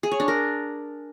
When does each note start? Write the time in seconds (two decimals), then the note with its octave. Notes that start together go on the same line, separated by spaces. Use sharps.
0.03 G#4
0.11 C#5
0.20 D4
0.28 A#4